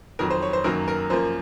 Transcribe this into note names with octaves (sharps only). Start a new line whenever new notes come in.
F2 D#3 F#3 A#4
C5
C#5
C5
F#2 D#3 F#3 A#3 A#4
A#4
F#2 F3 A#3 C5